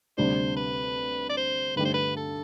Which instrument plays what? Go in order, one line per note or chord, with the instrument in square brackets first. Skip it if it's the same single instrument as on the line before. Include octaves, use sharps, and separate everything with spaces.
[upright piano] D2 C3 G3 D4 [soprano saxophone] C5
[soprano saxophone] B4
D5
C5
[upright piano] G2 D3 A3 D4 G4 [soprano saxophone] B4
[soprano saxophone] C5
B4
A4